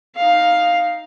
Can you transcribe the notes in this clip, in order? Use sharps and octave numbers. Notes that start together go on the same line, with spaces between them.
D#4 F5